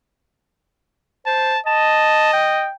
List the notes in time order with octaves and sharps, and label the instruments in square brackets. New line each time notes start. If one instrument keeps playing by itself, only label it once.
[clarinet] C5 [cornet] A5
[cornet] D#5 [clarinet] A5
[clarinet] G5